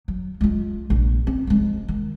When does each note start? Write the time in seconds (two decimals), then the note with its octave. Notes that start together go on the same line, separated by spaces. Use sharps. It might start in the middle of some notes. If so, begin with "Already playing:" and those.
0.08 F#3
0.41 G#3 F4
0.90 A#1
1.27 C4
1.47 F3 G#3
1.88 D#3